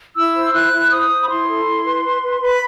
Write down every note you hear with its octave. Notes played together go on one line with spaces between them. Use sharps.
E4 E6
C5
E4 F#6
E4
C5 D#6
C5
B5
E4 C6
A4
E4
B4
B4
B4
B4 B5